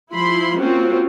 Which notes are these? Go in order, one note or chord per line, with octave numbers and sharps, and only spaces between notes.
F3 E4 B5 C6
A#3 C4 C#4 F4 F#4